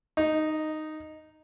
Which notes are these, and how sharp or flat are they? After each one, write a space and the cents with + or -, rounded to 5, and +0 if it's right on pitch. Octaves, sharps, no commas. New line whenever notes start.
D#4 -5